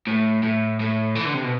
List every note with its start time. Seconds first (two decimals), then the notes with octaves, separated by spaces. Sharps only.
0.07 A2
0.43 A2
0.80 A2
1.16 E3
1.25 D3
1.34 C3
1.44 B2